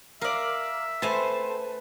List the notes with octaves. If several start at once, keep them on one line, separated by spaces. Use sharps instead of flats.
A#4 D5 E5 F5
A3 C4 B4 C5 G#5 A5